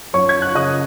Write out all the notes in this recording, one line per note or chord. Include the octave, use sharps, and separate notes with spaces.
F#2 C#5 C#6
G#6
F#6
C#3 D#5 D#6